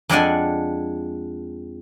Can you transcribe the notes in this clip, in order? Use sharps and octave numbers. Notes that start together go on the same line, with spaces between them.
F2 G#3 D4 D5 F#5 G#5